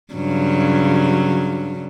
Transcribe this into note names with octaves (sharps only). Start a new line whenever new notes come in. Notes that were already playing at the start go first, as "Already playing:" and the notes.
G2 C#3 F#3